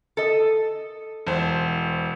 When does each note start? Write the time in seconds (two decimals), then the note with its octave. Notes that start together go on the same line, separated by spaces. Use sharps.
0.17 A4 D#5
1.27 E1 C5